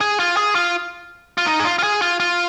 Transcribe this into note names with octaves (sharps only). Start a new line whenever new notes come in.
G#4
F4
G#4
F4
F4
D#4
G#4
F4
F4
G#4
F4
F4